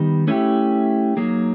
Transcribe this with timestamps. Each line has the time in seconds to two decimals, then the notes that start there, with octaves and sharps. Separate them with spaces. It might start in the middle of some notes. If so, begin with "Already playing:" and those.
Already playing: D#3 G3 B3 D#4
0.28 A3 C#4 E4 G4
1.17 F#3 A#3 D#4 G#4